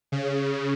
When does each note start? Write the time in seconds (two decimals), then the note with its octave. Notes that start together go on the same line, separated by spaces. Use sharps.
0.12 C#3